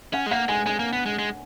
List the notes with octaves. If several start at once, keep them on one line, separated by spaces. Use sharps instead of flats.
C#4 F#5
G#3
A#3 F#5
G#3 G#5
G#3 G#5
A#3
B3
G#3
G#3